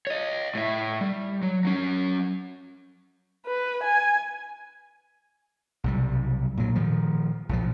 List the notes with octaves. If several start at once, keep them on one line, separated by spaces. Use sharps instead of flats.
C#5 D#5
A2 E5
G3
F#3
F#3 C#4
B4
G#5
B1 C3 G3
A#2 F#3
A#2 D#3 F3
B1 A#2 D3 F3